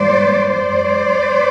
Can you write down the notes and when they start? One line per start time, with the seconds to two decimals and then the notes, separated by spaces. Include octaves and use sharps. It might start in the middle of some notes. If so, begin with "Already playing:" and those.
Already playing: G#2 E3 G3 A#3 C5 D5
0.50 F#2 G#3 C5 D5